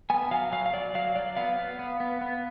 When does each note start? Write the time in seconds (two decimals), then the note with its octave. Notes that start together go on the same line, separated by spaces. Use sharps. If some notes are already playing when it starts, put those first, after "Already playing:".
0.10 B3 G#5
0.31 F#3 F5
0.52 F#3 F5
0.66 F5
0.74 F#3 D5
0.95 F#3 F5
1.16 F#3 D5
1.37 B3 F5
1.58 B3
1.79 B3
2.00 B3
2.21 B3